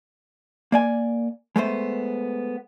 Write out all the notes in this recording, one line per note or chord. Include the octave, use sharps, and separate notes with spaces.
A#3 D5 G#5
G#3 A3 B3 C5